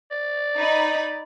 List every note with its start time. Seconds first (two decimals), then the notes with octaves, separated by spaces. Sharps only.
0.11 D5
0.57 D#4 B5